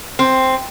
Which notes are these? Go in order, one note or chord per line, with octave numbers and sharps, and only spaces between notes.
C4